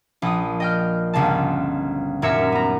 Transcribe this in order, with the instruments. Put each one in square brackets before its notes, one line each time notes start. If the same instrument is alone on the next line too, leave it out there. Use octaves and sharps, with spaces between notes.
[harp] A#1 D#6
D#5 G5 F6
G1 C#2 C#3 A5
D#1 F#2 A#4 C#5 E5 C#7
B3 A#5